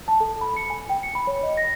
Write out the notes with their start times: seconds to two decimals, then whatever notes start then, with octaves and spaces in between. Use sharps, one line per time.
0.08 A5
0.20 A4
0.41 B5
0.57 C#7
0.70 G#5
0.89 G5
1.03 C#7
1.15 B5
1.27 C#5
1.43 D#5
1.57 A#6